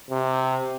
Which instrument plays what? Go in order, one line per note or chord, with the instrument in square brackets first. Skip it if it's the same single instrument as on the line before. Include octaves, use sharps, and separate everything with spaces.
[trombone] C3